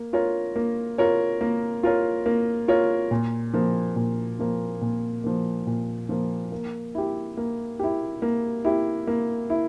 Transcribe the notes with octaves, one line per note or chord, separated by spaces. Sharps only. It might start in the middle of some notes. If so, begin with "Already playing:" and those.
Already playing: A#3
F4 A#4 C#5
A#3
F4 A#4 C#5
A#3
F4 A#4 C#5
A#3
F4 A#4 C#5
A#2
F3 A#3
A#2
F3 A#3
A#2
F3 A#3
A#2
F3 A#3
A#3
E4 G4
A#3
E4 G4
A#3
E4 G4
A#3
E4